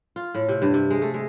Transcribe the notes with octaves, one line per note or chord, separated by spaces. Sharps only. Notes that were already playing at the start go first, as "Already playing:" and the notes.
F4
A2
C3
G2
C3
G#3
A3
G#3